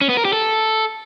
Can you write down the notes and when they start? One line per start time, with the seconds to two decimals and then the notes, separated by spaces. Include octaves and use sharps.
0.01 C#4
0.09 B3
0.17 A#4
0.25 G4
0.33 A4